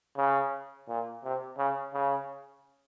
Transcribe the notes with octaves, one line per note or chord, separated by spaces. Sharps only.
C#3
A#2
C3
C#3
C#3